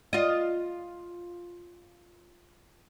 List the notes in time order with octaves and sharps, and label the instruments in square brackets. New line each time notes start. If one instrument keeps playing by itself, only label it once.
[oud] F4 D#5